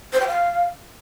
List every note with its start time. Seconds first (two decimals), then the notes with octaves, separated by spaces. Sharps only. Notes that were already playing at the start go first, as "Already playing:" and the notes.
0.13 C5
0.20 G5
0.27 F5